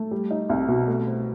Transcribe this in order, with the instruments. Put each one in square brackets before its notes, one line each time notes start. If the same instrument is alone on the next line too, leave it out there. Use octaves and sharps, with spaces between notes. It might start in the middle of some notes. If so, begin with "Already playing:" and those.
Already playing: [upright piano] A3
G3
D#4
C2
B2
A3
C4